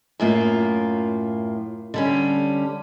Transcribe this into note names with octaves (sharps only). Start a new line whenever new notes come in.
F#2 A2 A#3 F4
D3 G3 C#4